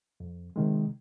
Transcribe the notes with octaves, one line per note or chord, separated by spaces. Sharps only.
F2
C3 D#3 G#3